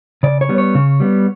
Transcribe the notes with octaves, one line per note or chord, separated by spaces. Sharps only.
C#3 D5
C#5
G3 B3
C#5
C#3
G3 B3